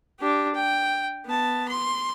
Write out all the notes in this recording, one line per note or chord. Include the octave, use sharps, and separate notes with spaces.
D4 G4
G5
B3 A5
C6